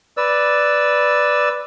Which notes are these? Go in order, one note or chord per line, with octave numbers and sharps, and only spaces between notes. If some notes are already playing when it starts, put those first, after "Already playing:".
B4 D5 E6